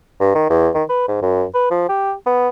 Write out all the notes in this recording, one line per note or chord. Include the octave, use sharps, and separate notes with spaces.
G2
D#3
E2
D#3
B4
G#2
F#2
B4
F3
G4
B3